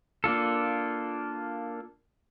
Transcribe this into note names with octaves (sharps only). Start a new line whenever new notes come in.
A#3 D4 F4 A4